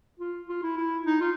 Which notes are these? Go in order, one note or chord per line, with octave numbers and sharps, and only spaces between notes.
F4
F4
E4
E4
D#4
F4